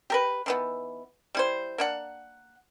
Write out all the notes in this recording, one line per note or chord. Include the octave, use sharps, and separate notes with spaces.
G4 A#4 B4
D#3 E3 B3
G3 E4 C5
A#3 D4 F#5